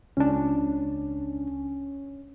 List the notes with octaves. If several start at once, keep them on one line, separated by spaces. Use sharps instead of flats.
C#2 C#4 D4